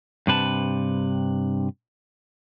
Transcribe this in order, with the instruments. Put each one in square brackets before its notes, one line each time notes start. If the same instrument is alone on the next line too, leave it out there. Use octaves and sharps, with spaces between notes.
[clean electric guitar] G2 C3 B4 A5